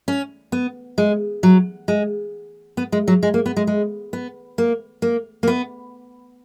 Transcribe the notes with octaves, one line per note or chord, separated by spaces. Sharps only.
C#4
B3
G#3
F#3
G#3
B3
G#3
F#3
G#3
A#3
B3
G#3
G#3
B3
A#3
A#3
A#3
B3